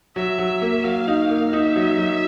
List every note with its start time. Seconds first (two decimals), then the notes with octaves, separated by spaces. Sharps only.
0.16 F#3 E5
0.39 F#3
0.62 A#3
0.84 F#3 F5
1.08 D#4
1.29 A#3
1.53 D#4 E5
1.76 F#3
1.98 F#3